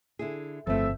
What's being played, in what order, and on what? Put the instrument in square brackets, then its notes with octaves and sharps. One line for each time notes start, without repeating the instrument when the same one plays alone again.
[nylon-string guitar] D3 E4 G#4
[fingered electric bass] G1 [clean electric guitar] F2 C4 [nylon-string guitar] E3 A3 [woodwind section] F3 A4 E5